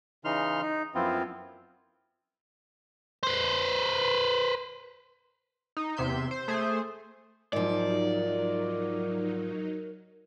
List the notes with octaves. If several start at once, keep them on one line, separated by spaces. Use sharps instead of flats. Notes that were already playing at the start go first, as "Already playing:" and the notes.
C#3 E3 D#4 C6 F6
D#4
F#2 F3 B3 C4 E4 F4
B4 C5
D#4
E2 C3 E5 C6 G6
C5
A3 G#4 C5
G#2 F3 F#3 D#4 A#4 D5